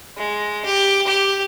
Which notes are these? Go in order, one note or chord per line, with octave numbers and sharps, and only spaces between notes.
G#3
G4
G4